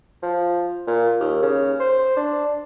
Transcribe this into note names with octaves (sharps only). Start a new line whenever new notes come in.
F3
A#2
D#2
C#3
C5
D4